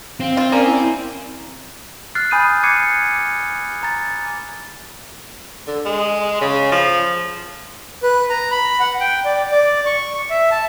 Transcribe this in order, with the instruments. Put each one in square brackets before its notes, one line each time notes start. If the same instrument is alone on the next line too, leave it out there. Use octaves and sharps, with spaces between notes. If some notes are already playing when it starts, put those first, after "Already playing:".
[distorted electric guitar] C4 [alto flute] F5
[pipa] F4
[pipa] A#3 [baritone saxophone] C#4 [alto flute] D5
[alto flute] E4
[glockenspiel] F6 F#6 A6 C7
G#5 B5 D#6 G6 D#7
D6 F#6 G#6 C7 C#7 D#7
A#5 A6
[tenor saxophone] D3
G#3
C#3
F3
[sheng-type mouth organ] B4
A#5
B5
F#5
G5
D5
D5
C#6
E5
A5